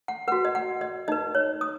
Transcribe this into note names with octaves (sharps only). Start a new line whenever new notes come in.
F#5
F#4 B4 F#5
D#5
F#5
D#5
D#4 B4 D#5
C#5
D#6